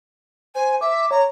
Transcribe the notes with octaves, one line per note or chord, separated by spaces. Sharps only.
C5 G#5
E5 D6
C#5 A#5